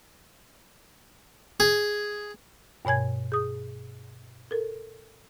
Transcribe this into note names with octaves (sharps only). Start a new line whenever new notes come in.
G#4
G2 B2 C#5 G#5 G#6
G#4 D#6
A4 A#4